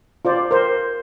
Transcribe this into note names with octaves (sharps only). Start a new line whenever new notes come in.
F4 C5 D5
A#4 C5